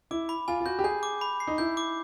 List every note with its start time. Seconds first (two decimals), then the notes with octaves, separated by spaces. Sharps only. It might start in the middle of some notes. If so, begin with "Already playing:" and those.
0.11 E4 D6
0.29 B5
0.48 F4 G#5
0.60 F4
0.65 F#4 G6
0.79 G4
0.84 G#4 G6
1.03 D6
1.21 B5
1.40 C7
1.47 D#4
1.58 E4 G6
1.77 D6